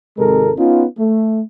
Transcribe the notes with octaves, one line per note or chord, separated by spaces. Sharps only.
G#1 C3 G#3 A4 A#4
B3 C#4 D#4 F4
A3